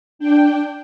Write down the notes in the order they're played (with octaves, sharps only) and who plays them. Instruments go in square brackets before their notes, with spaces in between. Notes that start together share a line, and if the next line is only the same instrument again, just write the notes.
[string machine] D4 G5